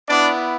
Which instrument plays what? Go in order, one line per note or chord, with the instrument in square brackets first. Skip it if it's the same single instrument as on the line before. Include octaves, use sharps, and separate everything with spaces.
[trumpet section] B3 D4 E4 D5